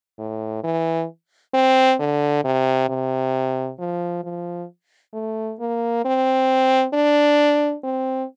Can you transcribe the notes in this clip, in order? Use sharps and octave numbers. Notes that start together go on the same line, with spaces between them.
A2
E3
C4
D3
C3
C3
F3
F3
A3
A#3
C4
D4
C4